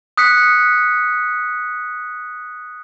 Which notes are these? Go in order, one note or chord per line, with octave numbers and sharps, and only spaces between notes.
D#6 F#6 B6 C#7